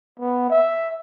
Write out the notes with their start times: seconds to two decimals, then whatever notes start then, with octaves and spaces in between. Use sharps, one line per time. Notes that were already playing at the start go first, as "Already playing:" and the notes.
0.19 B3
0.50 E5